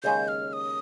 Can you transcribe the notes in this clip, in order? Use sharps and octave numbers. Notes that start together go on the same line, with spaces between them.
D#2 C#3 G#3 C#4 G#4 G6
F6
D#6